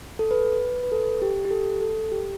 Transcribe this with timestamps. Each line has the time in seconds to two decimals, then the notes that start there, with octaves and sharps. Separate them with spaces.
0.19 A4
0.31 B4
0.83 B4
0.92 A4
1.22 G4
1.45 G4
1.50 A4
1.81 A4
2.12 G4